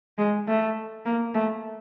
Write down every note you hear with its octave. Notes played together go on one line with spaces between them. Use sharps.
G#3
A3
A#3
A3